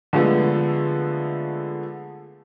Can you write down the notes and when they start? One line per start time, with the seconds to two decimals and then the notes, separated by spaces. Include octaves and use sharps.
0.13 D3 F3 G#3 A3 B3